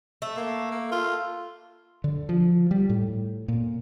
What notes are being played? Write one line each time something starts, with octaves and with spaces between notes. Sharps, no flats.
A3
A#3
A#3
F4
D3
F3
G3
A2
A#2